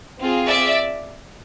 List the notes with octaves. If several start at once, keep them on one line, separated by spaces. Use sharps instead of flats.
C4 F4 G#4
D5 E5